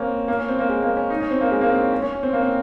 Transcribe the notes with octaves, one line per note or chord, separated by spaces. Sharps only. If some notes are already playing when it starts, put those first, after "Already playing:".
Already playing: A#3 C4 C#4
A#3
C#4
C4
A#3
G#3
A#3
C#4
D#4
C#4
C4
A#3
G#3
A#3
C4
C#4
C#4
C#4
C#4
C4
A#3
C4